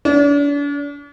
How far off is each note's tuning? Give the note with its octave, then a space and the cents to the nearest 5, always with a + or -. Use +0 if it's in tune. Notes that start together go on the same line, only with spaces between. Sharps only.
D4 -40